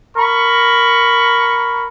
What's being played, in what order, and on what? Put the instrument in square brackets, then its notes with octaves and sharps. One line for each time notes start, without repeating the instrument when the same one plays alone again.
[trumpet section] A#4 B5 C#6